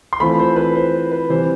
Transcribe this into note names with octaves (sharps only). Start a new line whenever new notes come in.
C6
E3 A3 C4 F4 B5
C5
B4
C5
B4
C3 E3 G3 C4 C5